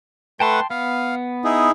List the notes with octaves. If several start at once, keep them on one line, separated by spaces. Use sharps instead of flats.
A3 B4 F#5 G5 A5 C6
B3 F5
D#4 E4 G#4